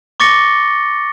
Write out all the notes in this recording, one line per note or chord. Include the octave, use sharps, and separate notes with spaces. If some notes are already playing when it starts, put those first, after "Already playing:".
C#6 D6 A6 A#6 C#7 G7